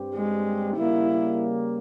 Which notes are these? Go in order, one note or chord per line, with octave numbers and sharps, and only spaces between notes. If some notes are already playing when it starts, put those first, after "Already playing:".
Already playing: G2 G3 C4 G4
G#3
C#3 G3 A#3 E4